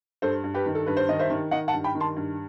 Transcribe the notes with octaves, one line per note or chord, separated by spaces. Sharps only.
G2 A4 C5
G2
G4 B4
D#3
A4
G2 B4
C5
D#3 D#5
C5 E5
D#3
D#3 D#5 F#5
F#5 A5
G2
G5 B5
D#3
A5 C6
G2